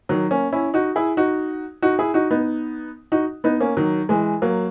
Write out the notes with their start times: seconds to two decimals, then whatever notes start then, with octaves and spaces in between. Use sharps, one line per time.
0.09 D#3 F#3
0.31 A#3 C#4
0.52 C#4 E4
0.74 D#4 F#4
0.96 E4 G#4
1.17 D#4 F#4
1.82 D#4 F#4
1.99 E4 G#4
2.14 D#4 F#4
2.31 B3 D#4
3.12 D#4 F#4
3.44 B3 D#4
3.60 A#3 C#4
3.77 D#3 F#3
4.09 E3 G#3
4.42 F#3 A#3